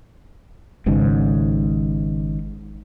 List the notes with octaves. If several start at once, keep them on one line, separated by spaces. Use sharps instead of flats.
G#1 G#2 C#3